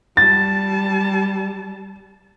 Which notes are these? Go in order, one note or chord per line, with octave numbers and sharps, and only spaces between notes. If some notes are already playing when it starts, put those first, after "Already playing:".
G3 A5 A6